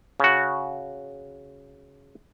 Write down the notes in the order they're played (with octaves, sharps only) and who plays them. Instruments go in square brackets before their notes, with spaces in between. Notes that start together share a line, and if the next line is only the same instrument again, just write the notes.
[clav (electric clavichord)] C#3 F#4